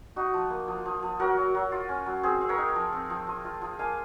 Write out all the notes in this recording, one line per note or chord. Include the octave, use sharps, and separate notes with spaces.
D#4 F#4
F3
A#3
F3
F3
F3
F#3 F#4 A#4
F#3
F#3
F4
C#4
F#3
C4 G#4 C5
C4
A#4 C#5
D#4
F3
C4
F3
F3
F4
F3
A#3 F5 G#5